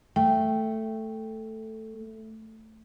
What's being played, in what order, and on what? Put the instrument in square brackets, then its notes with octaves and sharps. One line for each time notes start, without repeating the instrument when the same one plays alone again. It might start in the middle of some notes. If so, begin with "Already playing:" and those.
[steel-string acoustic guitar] A3 [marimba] G5